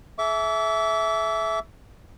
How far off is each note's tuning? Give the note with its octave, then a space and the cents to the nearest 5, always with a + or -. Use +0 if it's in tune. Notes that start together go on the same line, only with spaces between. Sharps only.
A4 -45 E5 +0 D6 -40